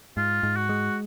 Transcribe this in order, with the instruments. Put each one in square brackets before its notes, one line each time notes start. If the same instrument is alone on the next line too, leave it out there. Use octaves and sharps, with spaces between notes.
[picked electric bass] G#2 [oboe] F4
[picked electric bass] G#2
[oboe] F#4
[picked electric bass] G#3